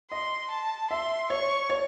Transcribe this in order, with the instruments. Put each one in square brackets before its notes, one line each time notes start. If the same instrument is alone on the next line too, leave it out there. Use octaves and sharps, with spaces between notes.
[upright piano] D#5 [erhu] C6
[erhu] A5
[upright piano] E5 [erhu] C6
[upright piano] C#5 [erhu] C#6
[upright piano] C#5